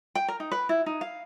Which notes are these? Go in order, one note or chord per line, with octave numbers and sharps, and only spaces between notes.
G5
A#4
D#4
B4
E4
D#4
F5